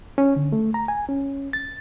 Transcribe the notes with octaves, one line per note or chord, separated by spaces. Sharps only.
C#4
D3
A3
A#5
G#5
C#4
A6